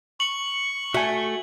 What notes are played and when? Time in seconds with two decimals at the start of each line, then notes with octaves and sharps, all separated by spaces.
0.20 C#6 F#7
0.94 A3 F#4 G#5